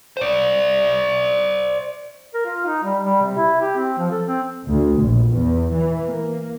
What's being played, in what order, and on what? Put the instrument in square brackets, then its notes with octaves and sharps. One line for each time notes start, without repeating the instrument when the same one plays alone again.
[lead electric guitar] C5 D5
[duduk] A#4
F4
D#4
G3
G3
C3
E4
G4
C4
F3
A4
C4
[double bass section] D2
A#1
E2
E3
A#3